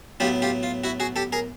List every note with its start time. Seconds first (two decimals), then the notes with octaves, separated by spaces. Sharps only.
0.20 A2 F#3 B3 F4 G4
0.42 F4 G4
0.63 F4
0.84 E4 F#4
1.00 F#4 G#4
1.16 G4 A4
1.32 G#4 A#4